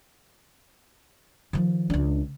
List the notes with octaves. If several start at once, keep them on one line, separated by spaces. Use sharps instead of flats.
D#3 F3
C#2 D4